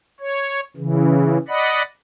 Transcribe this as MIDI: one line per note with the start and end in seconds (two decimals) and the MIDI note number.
0.20 0.60 73
0.77 1.38 49
0.77 1.38 52
1.48 1.82 74
1.48 1.82 75
1.48 1.82 78
1.48 1.82 83